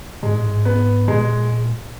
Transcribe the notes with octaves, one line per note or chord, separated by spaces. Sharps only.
G#2 G#3
A2
G#2
B3
A#2 G#3